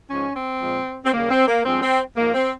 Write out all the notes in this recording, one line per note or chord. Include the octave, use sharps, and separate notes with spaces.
G#2 F3 G#3 C#4
C4
A#2 F3 G#3
C4
D#2 C#3 G3 A#3
C4
A#3
G2 F3 G#3 C4
C4
G#2 F3 G#3 A#3
C4